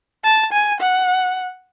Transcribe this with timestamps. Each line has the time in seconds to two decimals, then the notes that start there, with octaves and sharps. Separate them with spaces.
0.24 A5
0.53 G#5
0.81 F#5